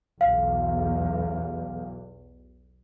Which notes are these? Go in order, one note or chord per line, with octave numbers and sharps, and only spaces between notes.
B1 E2 F5